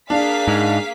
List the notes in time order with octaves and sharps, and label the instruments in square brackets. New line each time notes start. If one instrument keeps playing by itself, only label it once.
[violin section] A#3 G#4 B6 [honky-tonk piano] D4 [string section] F5
[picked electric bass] G#2